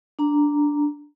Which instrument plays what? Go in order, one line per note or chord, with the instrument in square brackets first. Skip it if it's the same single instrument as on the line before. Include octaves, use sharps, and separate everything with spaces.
[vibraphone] D4 A#5